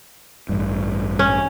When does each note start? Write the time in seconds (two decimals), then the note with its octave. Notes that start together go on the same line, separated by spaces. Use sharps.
0.49 A1 G2
1.19 C#4